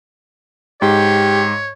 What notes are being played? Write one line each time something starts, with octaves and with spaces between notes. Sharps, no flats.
G#2 G4 C#5